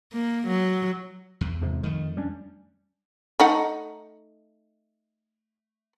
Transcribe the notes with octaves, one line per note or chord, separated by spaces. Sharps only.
A#3
F#3
E2
F2 G#2 C3
F2 D#3 A3
G3 C#4 D4
A3 D#4 F#5